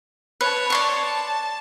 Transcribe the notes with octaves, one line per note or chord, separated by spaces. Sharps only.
B4 C#5 A5
D5 C6 C#6
A5